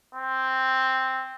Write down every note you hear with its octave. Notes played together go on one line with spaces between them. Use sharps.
C4